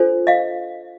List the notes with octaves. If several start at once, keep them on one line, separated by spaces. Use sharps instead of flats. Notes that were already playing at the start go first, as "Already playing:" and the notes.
Already playing: D4 F4 A4 C5
D#5 F5